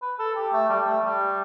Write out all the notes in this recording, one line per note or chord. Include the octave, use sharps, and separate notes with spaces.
B4
A4
G4
A3
G3
A3
G3